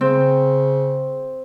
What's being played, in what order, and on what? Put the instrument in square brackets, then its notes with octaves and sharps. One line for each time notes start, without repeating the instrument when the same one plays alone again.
[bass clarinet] C#3 [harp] C4